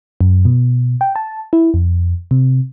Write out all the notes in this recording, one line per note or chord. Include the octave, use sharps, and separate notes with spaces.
F#2
B2
G5
A5
E4
F2
C3